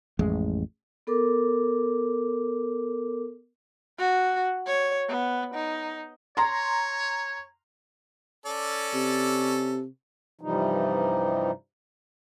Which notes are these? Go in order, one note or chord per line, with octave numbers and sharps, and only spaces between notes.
A1 F2 G#3
B3 A4 A#4 D6
F#4
C#5
B3
D#4
C#5 A#5 C6
C#4 A4 D5
C3
G2 C3 E3 F3 G3 D#4